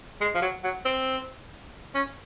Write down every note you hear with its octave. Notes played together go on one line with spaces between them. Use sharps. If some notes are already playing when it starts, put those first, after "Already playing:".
G#3
F3
F#3
F#3
C4
C#4